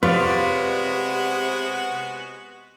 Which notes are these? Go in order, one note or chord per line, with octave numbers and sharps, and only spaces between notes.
C3 G#3 B3 F4 F#4 B4 C#5 D5